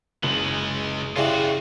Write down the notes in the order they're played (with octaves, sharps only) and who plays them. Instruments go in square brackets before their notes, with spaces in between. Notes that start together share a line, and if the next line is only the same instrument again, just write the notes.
[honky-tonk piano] F#1 F#7 [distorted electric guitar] C#2 G#3
[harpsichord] C#3 E3 G3 [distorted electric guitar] F4 F#4